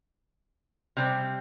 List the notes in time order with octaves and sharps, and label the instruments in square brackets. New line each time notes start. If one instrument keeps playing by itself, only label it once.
[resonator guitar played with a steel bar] C3 G3 C4